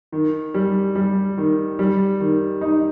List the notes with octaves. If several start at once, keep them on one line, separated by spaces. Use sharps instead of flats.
D#3
G3
G3
D#3
G3
D#3
D#4